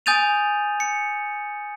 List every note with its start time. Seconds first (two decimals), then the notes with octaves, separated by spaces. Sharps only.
0.06 G#5 D#6 G6 A6 D#7 F7
0.80 C#7